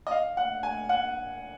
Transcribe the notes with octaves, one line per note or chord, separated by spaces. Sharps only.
D#5
F5
F#5
G#5
F#5